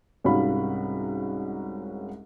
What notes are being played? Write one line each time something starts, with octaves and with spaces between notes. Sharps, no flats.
C2 G#2 C#4 F#4 F5 B5